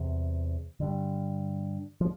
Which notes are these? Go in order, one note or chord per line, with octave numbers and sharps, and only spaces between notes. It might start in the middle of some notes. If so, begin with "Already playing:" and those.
Already playing: E2 C3
G2 D3
F3